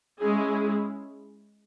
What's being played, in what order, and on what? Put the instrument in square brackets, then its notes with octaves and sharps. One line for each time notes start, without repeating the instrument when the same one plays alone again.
[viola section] G#3 C#4 E4 G#4